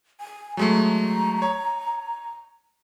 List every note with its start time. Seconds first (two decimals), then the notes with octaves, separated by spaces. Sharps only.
0.20 G#5
0.57 F#3 G#3 A3 A#5
1.42 C#5